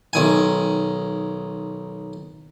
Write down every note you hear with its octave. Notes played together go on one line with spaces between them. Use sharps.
B1 D#3 G#5